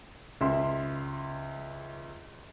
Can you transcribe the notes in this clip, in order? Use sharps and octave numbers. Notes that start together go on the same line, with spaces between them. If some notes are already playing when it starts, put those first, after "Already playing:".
C#2 E5 C6